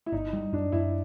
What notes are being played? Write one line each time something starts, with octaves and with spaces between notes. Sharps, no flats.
E4
G1 D#4
G3
F#2 D4
F#2 E4